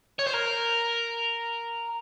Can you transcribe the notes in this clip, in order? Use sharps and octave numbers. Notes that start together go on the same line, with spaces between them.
C#5
C5
A#4